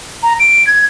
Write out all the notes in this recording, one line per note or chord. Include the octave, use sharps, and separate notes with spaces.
A#5
D7
G#6